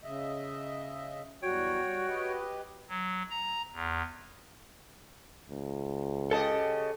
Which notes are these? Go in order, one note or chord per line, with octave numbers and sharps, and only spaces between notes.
C#3 D#5 E5
E2 F#3 G3 F#4 C#5 G5
G3
G4 B4 D#5
F#3
A#5
E2
C#2
C#3 G4 A4 D#5 A5